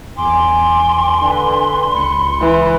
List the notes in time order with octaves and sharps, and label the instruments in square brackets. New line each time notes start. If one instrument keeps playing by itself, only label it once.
[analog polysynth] E2 D6 [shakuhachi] G#5 [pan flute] C6
[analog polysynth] D3 B4
[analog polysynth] C#2 C#7 [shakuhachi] B5
[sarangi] E3